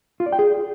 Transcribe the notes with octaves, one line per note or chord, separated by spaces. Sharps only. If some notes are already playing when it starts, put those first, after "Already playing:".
F4
D5
G5
G#4